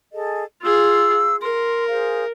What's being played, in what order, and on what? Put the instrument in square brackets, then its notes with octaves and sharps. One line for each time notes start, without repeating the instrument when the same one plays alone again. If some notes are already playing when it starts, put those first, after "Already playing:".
[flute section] G#4 A4 D#5
[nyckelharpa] F4 G#4 [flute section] F5 E6
[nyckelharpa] A#4 [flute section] C6
[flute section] G#4 C5 F5